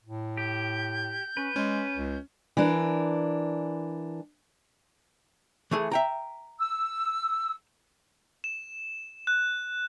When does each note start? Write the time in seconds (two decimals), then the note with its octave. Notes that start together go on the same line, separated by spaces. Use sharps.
0.04 A2
0.37 G4 G6
1.37 C#4 B4
1.56 G#3 C#4
1.96 C#2
2.57 E3 D4 A#4
5.71 E3 A3 G#4
5.91 E5 G5 A#5
6.59 E6
8.44 E7
9.27 F#6